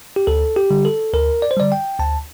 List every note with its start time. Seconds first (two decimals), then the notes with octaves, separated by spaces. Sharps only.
0.16 G4
0.27 D2 A4
0.56 G4
0.70 D3 G3
0.85 A4
1.14 D2 A#4
1.42 D5
1.51 C5
1.57 D3 G3 D5
1.72 G5
2.00 D2 A5